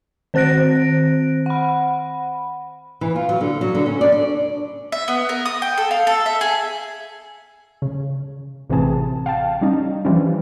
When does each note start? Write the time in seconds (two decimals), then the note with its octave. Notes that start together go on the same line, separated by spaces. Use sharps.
0.34 D#3 C4 C5 F#6 A#6 D7
1.46 F#5 B5
3.01 E3
3.16 F4
3.29 F#3
3.41 D3
3.61 F#3
3.75 D3
3.86 C#4
4.01 D5
4.12 D4
4.92 E5
5.08 B3
5.29 A#4
5.45 D#6
5.62 G5
5.77 A4
5.91 F5
6.07 A4
6.26 E5
6.41 G#4
7.82 C#3
8.70 A1 C3 E3 C4 G#4 A5
9.26 F5 G5 A5
9.61 G3 C#4 D#4
10.05 E3 F3 G3 C#4 D4